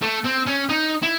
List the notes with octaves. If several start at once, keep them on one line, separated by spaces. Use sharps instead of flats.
A3
C4
C#4
D#4
E4